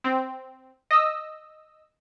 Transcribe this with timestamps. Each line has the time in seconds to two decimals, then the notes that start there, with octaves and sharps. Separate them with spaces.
0.04 C4
0.91 D#5 E6